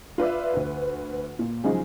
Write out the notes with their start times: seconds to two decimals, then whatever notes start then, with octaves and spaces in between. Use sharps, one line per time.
0.18 F4 B4 D5 E5
0.54 D2 B4
1.39 A#2
1.64 C#3 F3 F#3 G#3 D#4 G#4